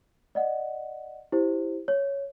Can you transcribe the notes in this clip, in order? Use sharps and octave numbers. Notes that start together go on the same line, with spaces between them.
D5 D#5 F#5
E4 G4 C5
C#5